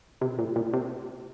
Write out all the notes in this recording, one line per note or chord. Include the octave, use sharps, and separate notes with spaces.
C3
A#2
A#2
C3